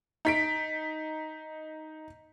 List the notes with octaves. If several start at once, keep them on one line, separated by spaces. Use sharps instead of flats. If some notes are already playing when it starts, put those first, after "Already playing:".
D#4 B6 D7